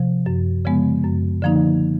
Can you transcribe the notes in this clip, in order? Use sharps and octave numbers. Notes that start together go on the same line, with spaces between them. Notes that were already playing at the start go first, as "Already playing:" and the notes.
Already playing: C3 F3
F#2
C#3 F3 G#3 B3
F#2
D3 F3 A#3 D#4